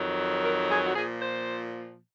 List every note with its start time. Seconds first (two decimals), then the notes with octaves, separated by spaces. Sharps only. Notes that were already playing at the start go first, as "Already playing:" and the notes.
Already playing: F2 D#3 F#3
0.43 A#4
0.70 G#4
0.85 F#4
0.95 A#2 F3 G#4
1.21 C5